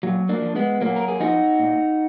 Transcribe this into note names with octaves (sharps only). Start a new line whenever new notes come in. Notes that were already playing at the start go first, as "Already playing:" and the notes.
A#2 F#3
A#3 D4
F3
G#3 B3
A#2 F#3 A#3
A#4
G#4
F3 D#4 F#4
A#2